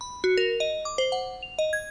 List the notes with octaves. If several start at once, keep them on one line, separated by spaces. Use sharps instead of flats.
B5
F#4
A#4
D#5
D6
C5
F#5
F7
D#5
G#6